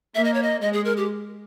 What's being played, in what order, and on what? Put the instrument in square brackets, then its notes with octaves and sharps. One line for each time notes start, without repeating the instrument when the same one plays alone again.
[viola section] A#3 [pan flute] E5
[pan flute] D#5
C#5
D#5
[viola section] G#3 [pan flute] D#5
[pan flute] G#4
A#4
G4